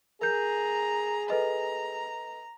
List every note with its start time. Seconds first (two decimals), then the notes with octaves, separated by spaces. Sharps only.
0.21 G#4 A#4 A#5 G6
1.30 A4 B4 D#5 A#5